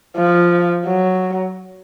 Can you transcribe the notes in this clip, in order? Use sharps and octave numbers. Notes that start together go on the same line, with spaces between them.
F3
F#3